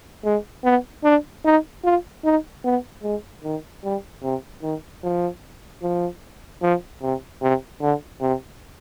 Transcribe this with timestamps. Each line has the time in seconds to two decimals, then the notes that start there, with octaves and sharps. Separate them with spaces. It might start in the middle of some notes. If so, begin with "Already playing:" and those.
0.25 G#3
0.64 B3
1.04 D4
1.45 D#4
1.84 F4
2.24 D#4
2.64 B3
3.03 G#3
3.44 D#3
3.84 G3
4.23 C3
4.62 D#3
5.03 F3
5.83 F3
6.62 F3
7.02 C3
7.42 C3
7.81 D3
8.21 C3